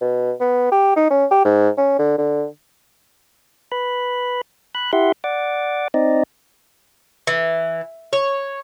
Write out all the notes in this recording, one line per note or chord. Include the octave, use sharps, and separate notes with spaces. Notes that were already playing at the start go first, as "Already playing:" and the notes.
B2
B3
G4
D#4
C#4
G4
G#2
C#4
D3
D3
B4 B5
B5 F#6
E4 G4 E5 F#5 C6
D5 F#5 D6
C4 D#4 D5 D#5
E3
C#5